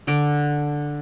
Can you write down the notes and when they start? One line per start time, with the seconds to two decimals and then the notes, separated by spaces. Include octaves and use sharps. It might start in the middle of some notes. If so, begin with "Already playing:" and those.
0.07 D3 D6